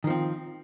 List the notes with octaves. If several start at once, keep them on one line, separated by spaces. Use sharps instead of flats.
D#3 F3 C4